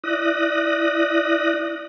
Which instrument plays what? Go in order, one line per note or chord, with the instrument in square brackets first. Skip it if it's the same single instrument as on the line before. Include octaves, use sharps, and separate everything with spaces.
[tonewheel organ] E4 D5 D#6 F#6 A#6